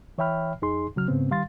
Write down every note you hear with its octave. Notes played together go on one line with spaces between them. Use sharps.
E3 C#5 E5 G5 B5 F6
F2 D#4 G#4 C6
C#3 F#3 F6
G#2 C#3 B3 C4
D#3 G3 F5 C6 A6